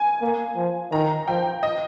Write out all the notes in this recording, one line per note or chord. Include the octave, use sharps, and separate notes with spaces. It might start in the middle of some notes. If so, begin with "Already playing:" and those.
Already playing: G#5
A#3
F3
D#3 A#5
F3 G5
D#5